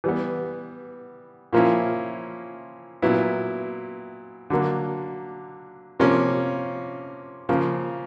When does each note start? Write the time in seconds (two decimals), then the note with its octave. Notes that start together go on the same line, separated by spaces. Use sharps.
0.04 E3 G3 B3
1.53 A#2 F3 A#3 C#4 E4
3.02 A#2 F#3 B3 E4
4.50 D3 F#3 A#3
6.00 C3 F3 A#3 C#4
7.49 C#3 F3 A#3